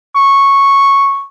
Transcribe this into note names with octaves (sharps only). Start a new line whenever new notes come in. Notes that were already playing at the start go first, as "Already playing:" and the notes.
C#6